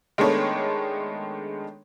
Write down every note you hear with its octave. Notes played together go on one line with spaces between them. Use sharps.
D#3 G#3 A3 B3 D4 C#5